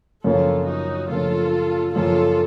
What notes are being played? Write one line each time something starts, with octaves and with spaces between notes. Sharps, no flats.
F#2 C#3 F3 A#3 F4 A4
D#4 F#4
F#2 C#3 F3 A#3 F4 A4
F#2 C#3 F3 A#3 F4 A4